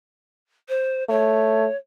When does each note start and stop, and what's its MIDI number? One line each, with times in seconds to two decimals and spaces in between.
0.69 1.04 72
1.09 1.66 57
1.09 1.76 73